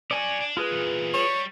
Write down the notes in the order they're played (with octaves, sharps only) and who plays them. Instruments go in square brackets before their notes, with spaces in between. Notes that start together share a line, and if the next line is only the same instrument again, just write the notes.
[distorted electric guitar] C#4 F#4 [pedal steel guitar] D5 G#5
[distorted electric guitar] D4
[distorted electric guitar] G#3 [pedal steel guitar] F4 G#4 B4
[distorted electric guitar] E2 A#2
[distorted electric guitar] G3 [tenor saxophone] C#5